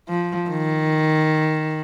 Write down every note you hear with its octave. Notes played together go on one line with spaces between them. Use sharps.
F3
D#3